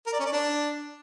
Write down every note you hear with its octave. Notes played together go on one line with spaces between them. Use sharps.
A#4
D5
C#4
D5
D4